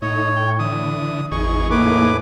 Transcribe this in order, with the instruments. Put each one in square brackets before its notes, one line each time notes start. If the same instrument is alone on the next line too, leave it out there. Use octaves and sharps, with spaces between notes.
[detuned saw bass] A2 [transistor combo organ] D#4 [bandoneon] C#5
[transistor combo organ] G5
[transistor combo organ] D3 E3 [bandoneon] D#6
[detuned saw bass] G#1 [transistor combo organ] E2 D#4 G#4 [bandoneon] C#6
[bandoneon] A2 B4 D6 [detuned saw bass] A#3